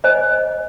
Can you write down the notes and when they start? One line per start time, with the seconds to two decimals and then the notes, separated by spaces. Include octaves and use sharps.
0.04 C5 D#5 G#5